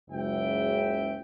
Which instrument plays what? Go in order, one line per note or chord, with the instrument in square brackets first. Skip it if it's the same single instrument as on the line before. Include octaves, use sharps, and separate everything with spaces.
[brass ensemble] F#1 C#2 F#2 C#3 E5 G5